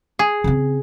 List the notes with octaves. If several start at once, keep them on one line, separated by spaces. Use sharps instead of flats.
G#4
C#3 C4